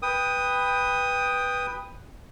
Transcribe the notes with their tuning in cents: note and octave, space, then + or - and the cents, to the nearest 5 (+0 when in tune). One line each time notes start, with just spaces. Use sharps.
B4 +0 G5 +20 D#6 +0